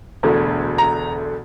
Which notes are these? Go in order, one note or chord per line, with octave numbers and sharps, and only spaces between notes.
E1 D2 D3 A3
A#5